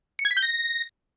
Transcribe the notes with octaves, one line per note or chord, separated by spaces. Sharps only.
C#7
G#6
B6
G6
A#6